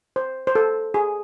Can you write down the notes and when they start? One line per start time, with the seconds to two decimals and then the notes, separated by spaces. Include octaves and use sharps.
0.16 C5
0.47 C5
0.55 A4
0.94 G#4